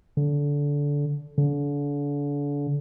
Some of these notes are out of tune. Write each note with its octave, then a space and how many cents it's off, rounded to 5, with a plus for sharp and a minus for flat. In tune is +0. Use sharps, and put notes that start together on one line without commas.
D3 -20
D3 -35